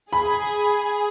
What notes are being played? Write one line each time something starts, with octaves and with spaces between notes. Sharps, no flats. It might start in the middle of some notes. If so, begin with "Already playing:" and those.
G#4 B5